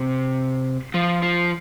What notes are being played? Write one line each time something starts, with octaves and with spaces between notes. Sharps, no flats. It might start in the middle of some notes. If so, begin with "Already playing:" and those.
Already playing: C3
F3
F3